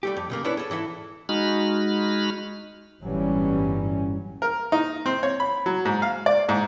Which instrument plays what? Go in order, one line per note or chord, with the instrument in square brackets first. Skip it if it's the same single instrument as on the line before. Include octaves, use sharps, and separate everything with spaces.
[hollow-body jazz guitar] G3 A3 G4
F2
B1 C#3 A#3
C#4 D4 E4 A4 B4 C#5
G#4 A4
G#2 E3 E4 A4
[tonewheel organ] G#3 D#4 F#4 B5 F6
[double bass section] G1 A2 E3 F#3 G3 C#4
[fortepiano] A#4
D#4
C4
C#5
B5
F#3
G#2
F5
D5
G#2